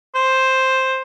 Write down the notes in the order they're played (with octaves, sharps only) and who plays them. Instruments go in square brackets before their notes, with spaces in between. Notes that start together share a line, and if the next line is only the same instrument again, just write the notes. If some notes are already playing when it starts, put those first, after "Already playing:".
[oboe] C5